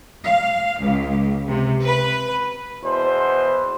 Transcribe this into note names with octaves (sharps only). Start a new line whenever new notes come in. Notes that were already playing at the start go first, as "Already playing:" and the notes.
F5
C#2
C3
B4
E2 B2 C5